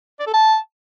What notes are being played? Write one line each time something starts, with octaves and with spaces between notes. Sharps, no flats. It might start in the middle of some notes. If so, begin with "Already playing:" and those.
D5
A4
A5